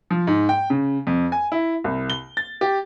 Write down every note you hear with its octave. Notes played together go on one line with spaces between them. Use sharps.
F3
G#2
G5
C#3
F2
G#5
E4
C2
G7
A6
G4